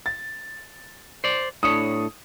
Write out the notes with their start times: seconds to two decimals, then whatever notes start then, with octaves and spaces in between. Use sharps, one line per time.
0.06 A6
1.24 C5 D5
1.63 A2 D4 C#5 D#6